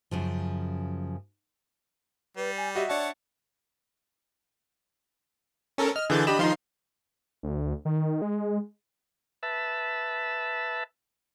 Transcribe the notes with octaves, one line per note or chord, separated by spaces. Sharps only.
F#2 C#3 F3
G3 B4
G#5
F#4 G4 D#5 E5
D4 C#5 D5 E5 F#5 A5
C#4 A4 A#4
D#5 F6
D3 E3 G#4 G6 A6
D4 G4 D#5 B5 E7
D#3 F3 D#4 F4 C6
D2
D#3
G#3
B4 E5 A5